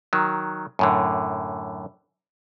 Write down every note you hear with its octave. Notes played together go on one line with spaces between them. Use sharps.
D#3 F#3
F#2 A2 D3